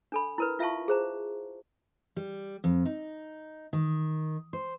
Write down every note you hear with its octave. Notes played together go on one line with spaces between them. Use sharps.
D4 A4 B5
E4 A#4 B4
F4 E5 F5 A5 C#6
G#4 C5 A#5
G3
F2
D#4
D#3
C5